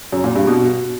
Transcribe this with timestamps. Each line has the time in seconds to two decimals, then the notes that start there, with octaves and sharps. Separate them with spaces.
0.12 F#2
0.24 A#2
0.36 G2
0.47 B2